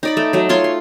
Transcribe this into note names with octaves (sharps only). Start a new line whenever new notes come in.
D#4 D5 B5
A3
F#3 A3
F4 C#5 C6
C6